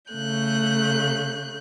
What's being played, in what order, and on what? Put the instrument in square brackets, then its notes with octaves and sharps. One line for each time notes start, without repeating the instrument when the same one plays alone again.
[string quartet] C#3 A3 F#6 G6